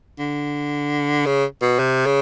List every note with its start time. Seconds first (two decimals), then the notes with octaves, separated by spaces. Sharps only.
0.19 D3
1.26 C#3
1.62 B2
1.79 C3
2.06 C#3